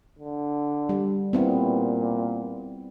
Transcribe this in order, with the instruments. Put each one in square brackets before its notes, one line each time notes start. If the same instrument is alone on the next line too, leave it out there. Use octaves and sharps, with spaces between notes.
[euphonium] D3
[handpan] G3
[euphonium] A#2 [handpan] B3 C4 E4